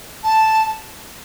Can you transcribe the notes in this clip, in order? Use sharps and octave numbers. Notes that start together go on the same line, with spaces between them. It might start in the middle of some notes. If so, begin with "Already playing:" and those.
A5